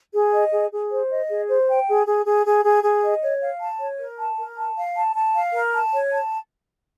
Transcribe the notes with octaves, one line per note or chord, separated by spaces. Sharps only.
G#4
D#5
G#4
G#4
C5
D#5
G#4
C5
G5
G#4
G#4
G#4
G#4
G#4
G#4
D#5
C#5
F5
A5
C#5
A#4
A5
A#4
A5
F5
A5
A5
F5
A#4
A5
C#5
A5